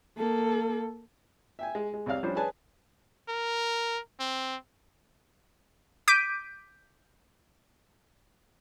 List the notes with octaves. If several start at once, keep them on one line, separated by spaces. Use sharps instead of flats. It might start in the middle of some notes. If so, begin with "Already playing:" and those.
A#3 A4
E5 G5 G#5
G#3
G#3
C2 C#5 D5 F5 F6
F3 G3 C#4 D4 C5
G#4 B4 C#5 D5 G#5 A5
A#4
C4
D6 G6 B6 D7 D#7